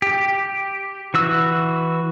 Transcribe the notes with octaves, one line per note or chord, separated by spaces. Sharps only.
G4
E3 F#4 E6